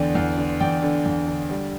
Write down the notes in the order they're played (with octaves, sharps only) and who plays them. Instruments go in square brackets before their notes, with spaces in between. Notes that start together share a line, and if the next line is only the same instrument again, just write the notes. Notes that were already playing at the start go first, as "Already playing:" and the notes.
Already playing: [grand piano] E2 D3 D5 G5
E2
D3
E2 D5 G5
D3
E2
D3
G3